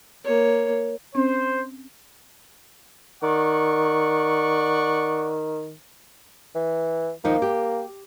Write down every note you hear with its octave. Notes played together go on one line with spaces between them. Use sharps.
A#3 C#5
C4 C#4 C5
D#3 D5 F#5 C#6
E3
D#2 F3 A#3 D#4
G4